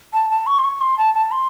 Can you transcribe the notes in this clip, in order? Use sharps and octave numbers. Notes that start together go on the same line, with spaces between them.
A5
A5
C#6
C6
C#6
C6
A5
A5
C6